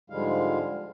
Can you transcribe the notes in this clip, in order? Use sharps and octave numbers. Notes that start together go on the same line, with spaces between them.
G#2 D3 F3 G3 G#3 F5